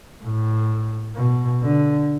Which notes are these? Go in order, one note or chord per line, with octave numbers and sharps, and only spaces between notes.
A2
B2
D3